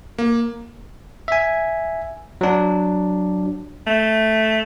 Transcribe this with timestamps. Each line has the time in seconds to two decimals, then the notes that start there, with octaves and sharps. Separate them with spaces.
0.18 A#3
1.28 E5 G#5
2.41 F#3 D4
3.87 A3